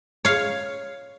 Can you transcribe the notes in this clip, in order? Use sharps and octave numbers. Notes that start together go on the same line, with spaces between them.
C#5 F5